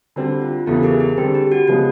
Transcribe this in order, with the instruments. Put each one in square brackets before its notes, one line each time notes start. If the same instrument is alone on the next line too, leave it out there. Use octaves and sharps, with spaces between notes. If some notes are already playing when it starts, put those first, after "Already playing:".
[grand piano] D3 G3 C4 [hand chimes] F#4
[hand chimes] F4
[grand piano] E2 C#3 E3 [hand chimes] G4 A4
[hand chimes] G#4 A#4
G#4
[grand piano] D3 G3 C4 [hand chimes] G4
[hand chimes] G4
F#4
[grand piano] C#3 F3 G#3 B3 [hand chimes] F#4